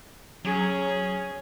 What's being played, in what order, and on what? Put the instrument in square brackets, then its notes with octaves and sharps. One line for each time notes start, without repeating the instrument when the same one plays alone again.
[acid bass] F#3 [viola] C#4 G#4